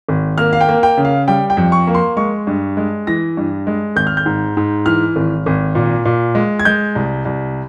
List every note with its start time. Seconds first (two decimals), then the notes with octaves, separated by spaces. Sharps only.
0.08 G#1
0.38 A#3 F6
0.53 F5
0.61 G5
0.69 A#3
0.83 G5
0.97 C#3
1.05 F5
1.28 G3 G5
1.50 G5
1.57 F2
1.72 C#6
1.87 A#3
1.95 C6
2.17 G#3 C#6
2.47 G2
2.77 G#3
3.07 E3 A#6
3.37 G2
3.67 G#3
3.96 G#1 G6
4.07 F6
4.17 G6
4.26 G#2
4.57 G#2
4.86 E3 F6
5.16 G#1
5.46 G#1
5.75 A#2
6.05 A#2
6.35 G#3
6.59 G#6
6.65 G#3 G6
6.95 C2
7.25 C2